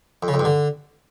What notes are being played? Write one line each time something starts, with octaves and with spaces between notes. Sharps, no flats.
F2
C#3
F2
G2
D3